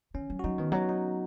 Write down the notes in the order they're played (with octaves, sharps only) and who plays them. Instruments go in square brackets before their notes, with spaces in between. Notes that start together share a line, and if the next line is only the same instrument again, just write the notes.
[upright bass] D#3 [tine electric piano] C#4
[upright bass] F#3
[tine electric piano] F#4
[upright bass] F#3 [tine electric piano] D#4
[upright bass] D#3 [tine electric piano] B3
[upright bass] F#3 [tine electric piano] D#4
[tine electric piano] D#4